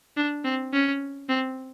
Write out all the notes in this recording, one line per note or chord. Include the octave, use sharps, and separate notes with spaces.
D4
C4
C#4
C4